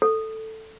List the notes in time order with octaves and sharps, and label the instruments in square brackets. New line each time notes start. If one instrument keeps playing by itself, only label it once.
[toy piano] A4